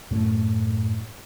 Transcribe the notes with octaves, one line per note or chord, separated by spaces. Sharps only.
F#2 A2 A3